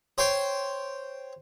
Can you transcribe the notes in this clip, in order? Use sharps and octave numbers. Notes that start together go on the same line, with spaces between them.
C5 C#5 G5 C6